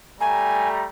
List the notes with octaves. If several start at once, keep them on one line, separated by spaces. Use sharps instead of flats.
G3 A3 G#5 A#5